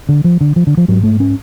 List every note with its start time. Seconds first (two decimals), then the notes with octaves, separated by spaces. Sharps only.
0.09 D3
0.24 F3
0.41 D3
0.56 F3
0.67 D3
0.77 F3
0.88 G#2 F#3
1.03 A3
1.20 C#4